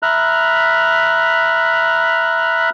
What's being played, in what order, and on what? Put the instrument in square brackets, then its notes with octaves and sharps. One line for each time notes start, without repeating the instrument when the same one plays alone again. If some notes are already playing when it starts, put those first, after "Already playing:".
[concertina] E5 A#5 B5 F6 F#6